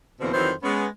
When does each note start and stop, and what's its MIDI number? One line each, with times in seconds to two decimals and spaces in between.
0.20 0.32 40
0.20 0.32 47
0.20 0.32 50
0.20 0.32 52
0.20 0.32 58
0.20 0.32 60
0.33 0.51 41
0.33 0.51 51
0.33 0.51 52
0.33 0.51 54
0.33 0.51 60
0.33 0.51 72
0.63 0.85 56
0.63 0.85 59
0.63 0.85 61